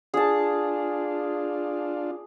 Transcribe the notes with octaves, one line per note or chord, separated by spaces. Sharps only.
D4 F4 G#4 A5